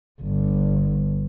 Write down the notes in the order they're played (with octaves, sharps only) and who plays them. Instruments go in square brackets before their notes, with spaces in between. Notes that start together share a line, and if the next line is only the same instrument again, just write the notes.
[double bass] G1